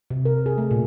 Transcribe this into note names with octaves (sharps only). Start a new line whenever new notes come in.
C3
A#4
G#4
A3
A#2